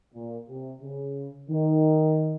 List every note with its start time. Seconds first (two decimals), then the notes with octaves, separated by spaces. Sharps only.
0.14 A#2
0.48 C3
0.81 C#3
1.49 D#3